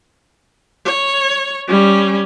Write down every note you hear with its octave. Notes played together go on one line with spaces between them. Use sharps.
C#5
G3 C#4